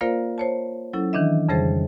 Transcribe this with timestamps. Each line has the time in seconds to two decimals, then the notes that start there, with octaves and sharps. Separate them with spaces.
0.01 A#3 F4 A#4 C5 D5 F5
0.38 C5 C#5 A5
0.93 F#3 C#4 E4 A4
1.13 D#3 E3 D4 D#5 E5
1.49 F2 C#3 G3 G#4 C5 A6